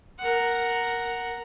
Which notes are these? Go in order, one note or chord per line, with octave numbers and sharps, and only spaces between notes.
A#4 F#5